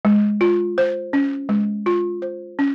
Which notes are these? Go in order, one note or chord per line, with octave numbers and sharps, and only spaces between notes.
G#3
F4
C5
C#4
G#3
F4
C5
C#4